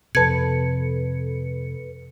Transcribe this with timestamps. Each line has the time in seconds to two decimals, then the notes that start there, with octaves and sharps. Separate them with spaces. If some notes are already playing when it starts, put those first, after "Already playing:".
0.15 F2 C3 A4 B4 A5 G#6 C#7